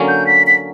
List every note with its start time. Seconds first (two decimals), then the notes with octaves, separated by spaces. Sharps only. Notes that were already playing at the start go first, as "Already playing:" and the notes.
Already playing: D3 F#3 A#3 C#4
0.08 G6
0.27 B6
0.47 B6